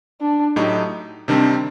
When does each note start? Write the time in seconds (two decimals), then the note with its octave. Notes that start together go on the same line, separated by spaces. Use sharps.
0.21 D4
0.56 A2 F#3 A3 D#4 G4
1.28 C3 D#3 G3 C4 D4